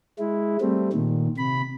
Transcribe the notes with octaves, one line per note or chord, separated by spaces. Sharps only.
G#3 E4
G3 A3 C4
A#2 D#3
C3 B5